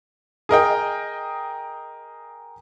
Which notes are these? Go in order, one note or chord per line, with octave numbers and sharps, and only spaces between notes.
G#4 A#4 D#5 G5